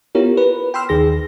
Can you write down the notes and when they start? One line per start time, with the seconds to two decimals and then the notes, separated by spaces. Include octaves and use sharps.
0.15 B3 E4 F4 G4 A#4 C#5
0.37 B4
0.74 G5 B5 C6 E6 F6
0.89 D#2 D#3 G#4 A#6